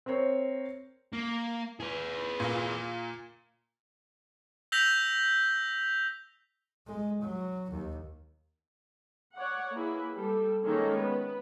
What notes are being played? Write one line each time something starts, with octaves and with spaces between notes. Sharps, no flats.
C4 A#4 C5 C#5
A#3
G#4 B4
A#2 A#3
E6 G6 A#6 B6 F7 G7
G#3
F#3
D#2
C#5 D5 F#5
A#3 E4 G#4 B4
G3 A4
D#3 G#3 A#3 C#4 A4 C#5
B3 B4